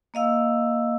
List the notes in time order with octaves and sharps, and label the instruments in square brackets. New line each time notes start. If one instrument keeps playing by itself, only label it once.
[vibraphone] A#3 D#5 F5 E6